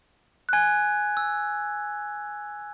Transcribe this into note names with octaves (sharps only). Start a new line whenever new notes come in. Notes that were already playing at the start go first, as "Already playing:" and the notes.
F#6
G#5 G#6
E6